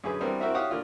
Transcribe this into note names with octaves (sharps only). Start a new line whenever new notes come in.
F#2 D3 G#4 B4
E3 G3 B3 C4 D4 A#4
C4 E4 F#4 A#4 E5
E4 G4 C#5 F5 F#5 D#6
D3 A#3 F4 D5